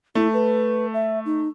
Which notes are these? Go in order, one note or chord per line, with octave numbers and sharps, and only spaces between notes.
A3 E4
B4
E5
D#4